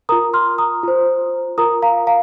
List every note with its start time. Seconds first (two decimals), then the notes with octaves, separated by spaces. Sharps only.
0.09 F4 A#4 A#5 D#6
0.33 C6 F6
0.58 A#5 D#6
0.83 F4 C5
1.58 F4 A#4 A#5 D#6
1.82 F5 A#5
2.07 F5 A#5